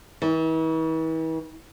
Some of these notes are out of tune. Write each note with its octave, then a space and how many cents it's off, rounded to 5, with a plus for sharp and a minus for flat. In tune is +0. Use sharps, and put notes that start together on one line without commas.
E3 -40